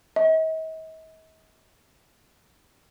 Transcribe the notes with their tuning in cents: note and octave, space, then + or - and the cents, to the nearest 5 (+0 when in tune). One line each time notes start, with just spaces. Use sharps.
D#5 +45